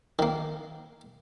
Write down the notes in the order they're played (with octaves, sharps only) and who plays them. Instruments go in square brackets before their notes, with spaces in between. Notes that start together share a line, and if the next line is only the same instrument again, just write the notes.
[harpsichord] D#3 A#3